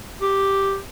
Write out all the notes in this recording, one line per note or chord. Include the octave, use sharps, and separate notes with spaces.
G4